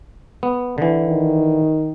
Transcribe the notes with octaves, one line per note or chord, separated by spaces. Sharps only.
B3
D3 E3
D#3